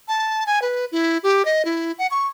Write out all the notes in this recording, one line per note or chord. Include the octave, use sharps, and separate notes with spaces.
A5
G#5
B4
E4
G4
D#5
E4
F#5
C#6